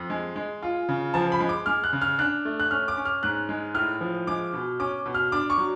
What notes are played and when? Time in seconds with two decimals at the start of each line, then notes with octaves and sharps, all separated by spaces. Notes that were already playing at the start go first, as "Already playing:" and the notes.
Already playing: F2
0.10 G#3
0.36 G#3
0.62 F4
0.89 C#3
1.14 F3 A5
1.32 B5
1.40 G#3
1.49 D6
1.66 G#3 F6
1.84 F#6
1.93 C#3
2.02 F6
2.19 D4 F#6
2.45 A3
2.60 F#6
2.71 C#4 F6
2.88 D6
2.97 C#4
3.05 F6
3.23 G#2 F#6
3.49 G#3
3.75 A2 F6
4.01 F3
4.27 G#3 D6
4.53 B2
4.80 C#4 D6
5.06 B2
5.15 F6
5.32 D4 D6
5.50 C#6
5.58 F#3